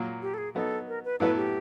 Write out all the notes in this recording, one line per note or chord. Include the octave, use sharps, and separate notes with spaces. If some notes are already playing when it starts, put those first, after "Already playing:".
Already playing: A#2 F#3 A#3
G4
A4
G#4
F#3 B3 D#4 A4
A#4
B4
A2 F#3 B3 E4 A4 B4
G4